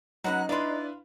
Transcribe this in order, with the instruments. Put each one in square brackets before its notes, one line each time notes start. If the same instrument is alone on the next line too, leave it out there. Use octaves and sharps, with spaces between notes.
[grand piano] F#3 C#4 [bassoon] D#4 [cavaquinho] F#4 B4 F#5 [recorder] F#6
[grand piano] D4 E4 B4 [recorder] D5 [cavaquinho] F5 C6